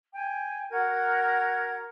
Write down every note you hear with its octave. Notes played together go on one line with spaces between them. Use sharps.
G5 G#5
F#4 A#4 F#5 G#6